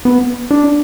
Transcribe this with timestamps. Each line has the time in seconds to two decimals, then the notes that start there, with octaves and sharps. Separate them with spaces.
0.05 B3
0.51 D4